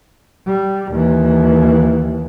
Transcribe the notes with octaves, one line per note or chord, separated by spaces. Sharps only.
G3
D#2 E3